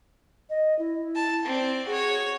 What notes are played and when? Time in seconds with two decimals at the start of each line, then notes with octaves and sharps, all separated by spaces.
0.50 D#5
0.79 E4
1.15 A5
1.45 C4 D5
1.87 F#4 G#4 C#5